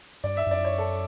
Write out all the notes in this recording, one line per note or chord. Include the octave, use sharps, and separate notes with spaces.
G2 D5
E5
G2
F#2 D5
C#5
A4